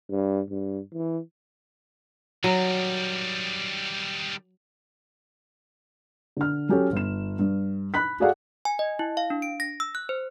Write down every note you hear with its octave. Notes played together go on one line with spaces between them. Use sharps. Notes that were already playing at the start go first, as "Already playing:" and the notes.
G2
G2
E3
D#3 F#3 G3
D3 F6
F#3 C#4 G4 A4 C#5
G1 E7
G2
B5 F#6 B6
F#4 G#4 A4 D5 F5 F#5
G#5
D#5
E4
F5
D4
D7
A#6
E6
F#6
C5